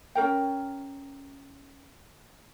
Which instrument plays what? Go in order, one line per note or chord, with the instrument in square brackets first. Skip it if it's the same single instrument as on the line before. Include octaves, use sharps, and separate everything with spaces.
[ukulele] C#4 F4 A#4 G5